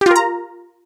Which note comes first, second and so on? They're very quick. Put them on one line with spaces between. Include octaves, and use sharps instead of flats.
G4 F4 A#4 A#5